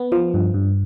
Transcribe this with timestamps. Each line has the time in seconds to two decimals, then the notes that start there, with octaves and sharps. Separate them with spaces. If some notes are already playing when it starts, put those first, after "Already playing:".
Already playing: B3
0.12 F3
0.34 G2
0.54 G2